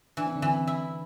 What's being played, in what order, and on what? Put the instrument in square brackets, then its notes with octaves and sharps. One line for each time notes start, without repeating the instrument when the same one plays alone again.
[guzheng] E3 [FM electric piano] D4
[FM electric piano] C4
D3 D4
[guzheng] E3
E4